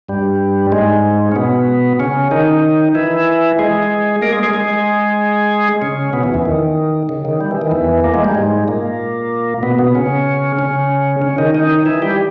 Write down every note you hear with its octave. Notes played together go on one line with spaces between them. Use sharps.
G2 G3
G#2 G#3
C#4
B2 B3
C#3 C#4
D#3 D#4
E3 E4
G#3 G#4
A#3 A#4
G#3 G#4
G#3 G#4
G#3 G#4
C#3 C#4
B2 B3
E2 E3
E2 E3
D#3
C#3
D#3
G3
E3
D#3
E2 E3
A#3
G#3
G3
G#2 G#3
A#2 A#3
B2 B3
B2 B3
C#3 C#4
C#3 C#4
C#3 C#4
D#3 D#4
D#3 D#4
E3 E4
G3 G4